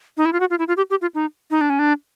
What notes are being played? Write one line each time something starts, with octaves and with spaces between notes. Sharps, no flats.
D#4
E4
F4
F#4
F4
E4
F4
G4
G4
F4
D#4
D#4
D4
C#4
D4